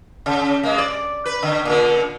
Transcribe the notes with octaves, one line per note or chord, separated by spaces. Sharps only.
C#3
G#3 A#3
D5
B4
D3
A#2 D3